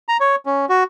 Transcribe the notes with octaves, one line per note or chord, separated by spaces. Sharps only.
A#5
C#5
C#4
F#4